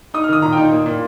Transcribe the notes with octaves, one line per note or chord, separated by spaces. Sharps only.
D#4 D#6
F6
D#3 D#6
A#2 A#5
G5
D#4
A#3
A#2